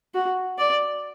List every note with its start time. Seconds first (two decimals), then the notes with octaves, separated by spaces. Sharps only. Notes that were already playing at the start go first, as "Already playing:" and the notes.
0.14 F#4
0.58 D5